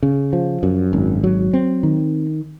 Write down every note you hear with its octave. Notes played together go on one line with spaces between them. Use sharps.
C#3
F3
F#2
G#1
F#3
C4
D#3